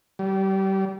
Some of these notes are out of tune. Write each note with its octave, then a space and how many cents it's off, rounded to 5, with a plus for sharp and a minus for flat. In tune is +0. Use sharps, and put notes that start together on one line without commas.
G3 -25